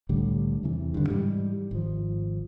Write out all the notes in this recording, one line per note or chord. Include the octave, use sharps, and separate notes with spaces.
C2 A2 D3 G3
E2 C3 E3
G2 D3
G#2 E3 G3
G#1 F3